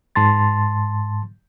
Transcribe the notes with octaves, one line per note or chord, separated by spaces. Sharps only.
G#2 A5 C6 A6